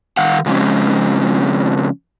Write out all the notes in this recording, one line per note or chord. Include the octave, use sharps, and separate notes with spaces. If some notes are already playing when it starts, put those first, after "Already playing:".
D#3 F5 F#5
C#3 F3 G#3 C4 C#4